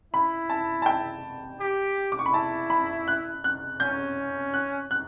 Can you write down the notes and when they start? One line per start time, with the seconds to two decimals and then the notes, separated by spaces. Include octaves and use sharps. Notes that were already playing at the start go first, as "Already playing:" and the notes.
0.13 E4 B5
0.50 A5
0.82 A5
0.86 G5
1.60 G4
2.12 D6
2.19 C#6
2.26 B5
2.33 E4 A5
2.70 B5
3.08 F#6
3.44 F#6
3.80 C#4 G6
4.54 F#6
4.91 F#6